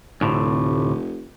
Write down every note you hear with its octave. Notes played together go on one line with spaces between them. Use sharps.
F1 D2 A2 C3